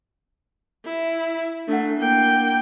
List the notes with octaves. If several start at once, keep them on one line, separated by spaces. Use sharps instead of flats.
E4
A3 D4 E4 F#5
A#3 G5